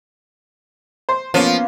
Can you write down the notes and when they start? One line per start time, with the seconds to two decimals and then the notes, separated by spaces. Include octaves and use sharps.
1.09 C5
1.34 F3 A#3 B3 C#4